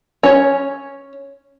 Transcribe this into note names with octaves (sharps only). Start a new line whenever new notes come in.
C#4 C#5